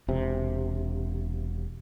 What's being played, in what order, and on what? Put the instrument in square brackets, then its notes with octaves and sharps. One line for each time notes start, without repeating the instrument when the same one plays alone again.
[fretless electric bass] E1 C3